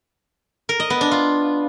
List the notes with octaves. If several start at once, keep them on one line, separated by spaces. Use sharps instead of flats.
A#4
D#5
B3
D4
F4